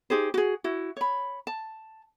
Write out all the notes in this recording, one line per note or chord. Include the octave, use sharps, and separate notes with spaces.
D#4 G4 G#4 C5
F#4 G#4
E4 F#4
C#5 B5
A5